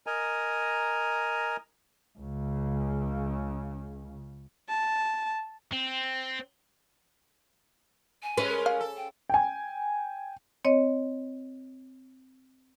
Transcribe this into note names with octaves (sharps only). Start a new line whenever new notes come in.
A#4 D#5 G#5 A#5
C#2 C#3
A5
C4
G#5
G#3 A3 C#4 B4
A#4
F5
A4
G5
G5 G#5
C4 C#5 D#5